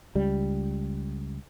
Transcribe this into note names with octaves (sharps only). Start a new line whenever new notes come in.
C#2 G3